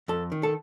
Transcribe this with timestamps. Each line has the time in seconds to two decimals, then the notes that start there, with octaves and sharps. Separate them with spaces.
0.08 F2 A4
0.32 D#3
0.43 A4